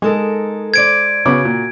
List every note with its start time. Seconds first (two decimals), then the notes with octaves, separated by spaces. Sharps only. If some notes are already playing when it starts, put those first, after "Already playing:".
0.02 G#3 D#4 A4 A#4
0.74 C5 D5 G#6 D7
1.26 C#3 B3 F#4 D6
1.45 A#2